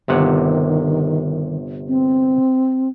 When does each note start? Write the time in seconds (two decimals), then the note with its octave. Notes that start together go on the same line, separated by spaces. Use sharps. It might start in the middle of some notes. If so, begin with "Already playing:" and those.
0.08 G1 C3 D#3 F#5
1.88 C4